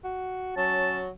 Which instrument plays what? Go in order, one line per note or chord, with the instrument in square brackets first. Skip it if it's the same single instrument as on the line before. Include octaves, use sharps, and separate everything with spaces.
[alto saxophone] F#4
[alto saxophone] F#3 [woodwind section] C#4 A5